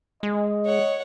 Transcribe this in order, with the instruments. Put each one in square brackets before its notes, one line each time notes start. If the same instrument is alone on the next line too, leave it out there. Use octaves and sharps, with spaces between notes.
[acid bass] G#3 [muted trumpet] D#5
[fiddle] C#5 F#5